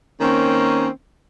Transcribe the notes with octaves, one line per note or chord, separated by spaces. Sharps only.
D#3 A#3 C4 C#4